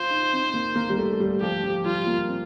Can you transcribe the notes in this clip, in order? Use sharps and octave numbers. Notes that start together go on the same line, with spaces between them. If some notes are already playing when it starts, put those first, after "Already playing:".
Already playing: F4 C5
D#4
C4
A#3
A#3
G3
A3
A3
G3
F3 G4
F3
G3 F4
A#3
C4